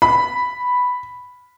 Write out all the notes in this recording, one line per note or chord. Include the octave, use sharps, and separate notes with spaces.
B5